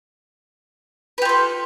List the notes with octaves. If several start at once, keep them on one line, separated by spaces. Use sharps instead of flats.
F4 G4 A4 B4